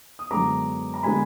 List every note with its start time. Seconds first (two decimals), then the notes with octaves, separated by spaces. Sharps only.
0.19 D#6
0.31 F#2 D3 G#3 B3 A#5 D6
0.94 A#5
1.03 D3 G#3 B3 G#5 B5